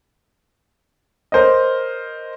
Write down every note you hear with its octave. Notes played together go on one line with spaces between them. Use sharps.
A#4 C5 C#5 D#5